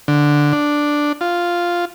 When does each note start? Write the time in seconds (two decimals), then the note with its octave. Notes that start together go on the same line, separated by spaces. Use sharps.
0.08 D3
0.53 D4
1.21 F4